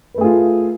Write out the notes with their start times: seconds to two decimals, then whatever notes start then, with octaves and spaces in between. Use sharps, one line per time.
0.14 B4
0.18 A3
0.21 G#4
0.24 F4